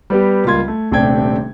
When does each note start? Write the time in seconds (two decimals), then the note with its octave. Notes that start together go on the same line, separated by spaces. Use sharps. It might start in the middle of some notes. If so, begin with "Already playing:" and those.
0.10 G3 B3 G4
0.44 C#2 G3 A#3 F4 C6 G#6
0.68 A3
0.91 D#1 C3 A3 D4 G5 G#6